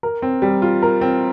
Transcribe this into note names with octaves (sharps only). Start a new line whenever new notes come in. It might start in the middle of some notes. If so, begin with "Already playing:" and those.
A#4
C4
G3
F4
A#4
C4